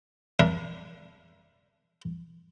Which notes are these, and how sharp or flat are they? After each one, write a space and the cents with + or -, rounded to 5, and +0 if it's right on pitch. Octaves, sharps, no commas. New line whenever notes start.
D4 +0 A#4 +35 E5 +30